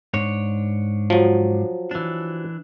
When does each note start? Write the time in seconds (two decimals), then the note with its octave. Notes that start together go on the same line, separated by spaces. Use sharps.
0.14 G#2 D4 C#5
1.10 F3 F#3
1.91 E3 D4